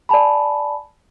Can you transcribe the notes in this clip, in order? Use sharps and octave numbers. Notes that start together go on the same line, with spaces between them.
D5 G#5 A5 B5